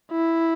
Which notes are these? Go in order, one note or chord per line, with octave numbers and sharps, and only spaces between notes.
E4